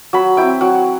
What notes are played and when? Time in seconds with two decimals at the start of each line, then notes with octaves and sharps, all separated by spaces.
0.13 F#3 B5
0.37 C4 E4 G5
0.61 F#3 F#5